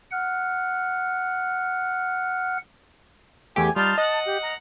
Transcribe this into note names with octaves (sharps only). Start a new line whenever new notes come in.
F#5 F6 F#6
E2 A3 G4 G#5
G3 D#4 F4 A5
D#5 F#5
G4
A#5